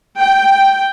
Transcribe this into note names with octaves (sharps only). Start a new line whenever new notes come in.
G5